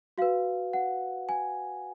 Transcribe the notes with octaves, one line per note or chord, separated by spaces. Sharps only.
F#4 B4 F5
F#5
G#5